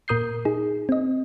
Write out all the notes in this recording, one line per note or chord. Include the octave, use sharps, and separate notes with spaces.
A#2 A#4 D#6 G6 C7
D#4 G#4
C4 D#5